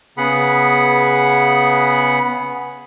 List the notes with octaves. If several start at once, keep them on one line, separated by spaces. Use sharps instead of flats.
C#3 B3 G#4 F#5 B5